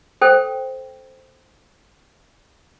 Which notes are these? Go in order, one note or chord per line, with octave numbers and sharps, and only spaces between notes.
A4 C5 G5